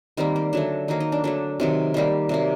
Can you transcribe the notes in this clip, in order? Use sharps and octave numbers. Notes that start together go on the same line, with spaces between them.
D#3 G3 A#3 C4
C4
D3 F#3 A3 D4
D#3 F#3 A#3 D#4
D#4
D4
D3 F#3 A3 D4
C3 D#3 F#3 C4
D#3 G3 A#3
C3 F#3 A#3